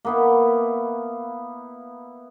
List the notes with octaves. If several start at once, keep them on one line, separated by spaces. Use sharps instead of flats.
A#3 B3 E4